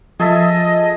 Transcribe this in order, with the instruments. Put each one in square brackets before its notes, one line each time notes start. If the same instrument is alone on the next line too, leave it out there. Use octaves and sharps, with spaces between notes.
[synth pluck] F3 [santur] G#4 A4 E5 [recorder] D#5